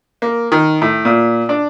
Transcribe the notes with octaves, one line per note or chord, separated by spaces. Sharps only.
A#3
D#3
A2
A#2
D4